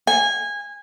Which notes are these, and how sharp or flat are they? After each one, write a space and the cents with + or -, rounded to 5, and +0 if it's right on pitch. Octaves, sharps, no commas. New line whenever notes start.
G#5 -20